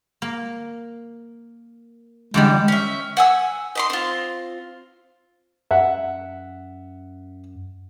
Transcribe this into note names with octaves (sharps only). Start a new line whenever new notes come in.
A#3
E2 D3 G3 G#3
C#4 E5
F#5 G#5 E6
D#5 B5 C6
C4 F4
F#2 E5 F#5